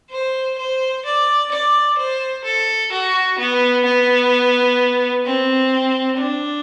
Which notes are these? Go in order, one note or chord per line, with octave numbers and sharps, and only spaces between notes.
C5
C5
D5
D5
C5
A4
F#4
B3
B3
C4
D4